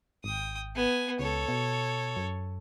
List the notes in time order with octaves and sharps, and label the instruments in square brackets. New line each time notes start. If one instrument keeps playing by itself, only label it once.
[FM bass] G#1 [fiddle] G5 D#6
[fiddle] B3 G#5
[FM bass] C#2 [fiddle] A4 C#5
[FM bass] B2
F#2